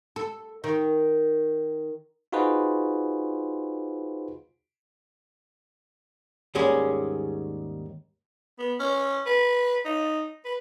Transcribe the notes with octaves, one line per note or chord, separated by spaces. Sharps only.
A4
D#3
D#4 F4 F#4 G#4 B4 C5
D#2 G#2 G3 G#3 C#4 G#4
B3
C#4
B4
D#4
B4